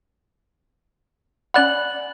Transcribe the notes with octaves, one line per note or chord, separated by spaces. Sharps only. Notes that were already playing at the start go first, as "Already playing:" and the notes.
C#4 D5 F#5 B5 F#6 F#7